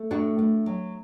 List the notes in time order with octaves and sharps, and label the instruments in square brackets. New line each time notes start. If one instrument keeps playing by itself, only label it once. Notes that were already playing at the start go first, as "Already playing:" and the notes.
Already playing: [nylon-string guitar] A3
A2 D4 F#4
A2
F#3